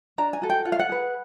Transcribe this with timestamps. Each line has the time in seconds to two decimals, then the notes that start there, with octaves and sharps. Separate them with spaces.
0.18 D4 A#5
0.33 G#5
0.42 F#4 A4
0.50 G5
0.65 F4 F#5
0.72 F5
0.79 F#5
0.89 G#4 B4